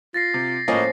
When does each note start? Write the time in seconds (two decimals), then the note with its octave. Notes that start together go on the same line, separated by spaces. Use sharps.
0.14 F4 A6 A#6 C7
0.34 C3
0.68 A2 F3 A#3 C#4 D#5